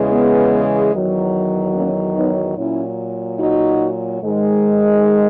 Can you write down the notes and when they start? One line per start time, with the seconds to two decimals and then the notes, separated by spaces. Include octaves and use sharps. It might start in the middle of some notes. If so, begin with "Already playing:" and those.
Already playing: E2 C#3 E3 G#3
0.11 B3
0.93 E2 D#3 F#3
1.74 A#3 C#4
2.16 B3 D#4
2.56 A#2 F#3 C#4 E4
3.38 D#4 F#4
4.21 G#2 D#3 G#3